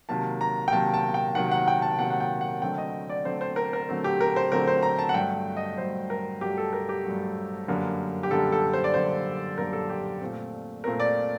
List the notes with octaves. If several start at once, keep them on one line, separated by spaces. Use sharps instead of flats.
C3 D#3 F#3 A#3 A5
A#5
G5
C3 D#3 F#3 A#3 A5
A5
G5
C3 D#3 F#3 A#3 F#5
F#5
G5
A5
C3 D#3 F#3 A#3 F#5
F#5
G5
F#5
D3 F#3 A3 C4 G5
D#5
D5
D3 F#3 A3 C4 C5
C5
A#4
A#4
D3 F#3 A3 C4
G4
A#4
C5
D3 F#3 A3 C4 A#4
C5
A#5
A5
F#5
G2 F#3 A3 G5
D#5
G2 F#3 A3 C5
A#4
G2 F#3 A3 G4
A4
A#4
G4
G2 F#3 A3
F#2 D3 G3 A#3
G4
F#2 D3 G3 A#3 A4
A4
C5
D5
F#2 D3 G3 A#3 C5
F#2 D3 G3 A#3 A#4
A4
G4
A#2 A3 C4
A#2 A3 C4 A#4
D5